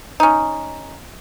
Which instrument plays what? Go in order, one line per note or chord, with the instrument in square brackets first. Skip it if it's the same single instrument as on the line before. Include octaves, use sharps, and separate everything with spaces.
[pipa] C#4 D#4